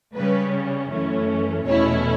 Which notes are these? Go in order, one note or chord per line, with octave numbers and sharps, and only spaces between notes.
C#3 G3 C#4 B4
F#2 E3 A3 C#4
E2 B2 A3 C#4 E4 C#5